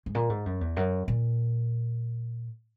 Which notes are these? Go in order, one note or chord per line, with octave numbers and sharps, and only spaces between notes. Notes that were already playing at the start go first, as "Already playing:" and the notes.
G#2
A#2
G#2
F#2
E2
F#2
A#2